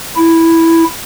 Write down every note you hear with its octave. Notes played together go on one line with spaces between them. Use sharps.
E4